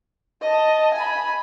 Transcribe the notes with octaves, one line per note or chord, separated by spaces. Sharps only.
D#5 A5
G#5 B5